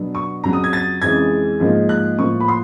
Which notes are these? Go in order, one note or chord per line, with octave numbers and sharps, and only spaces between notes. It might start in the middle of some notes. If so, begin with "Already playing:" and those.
Already playing: B2 F#3 B3 D4
C#6
F2 C#3 F#3 A#5
D#6
G#6
A6
F2 C#3 E3 G#3 G#6
G#2 F3 A#3 D#4
F#6
A2 F3 A#3 C#6
B5
C6